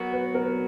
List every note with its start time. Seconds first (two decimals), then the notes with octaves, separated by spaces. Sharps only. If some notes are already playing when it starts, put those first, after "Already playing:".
Already playing: F#3 B3 F#4 A#4
0.12 B4
0.35 A#4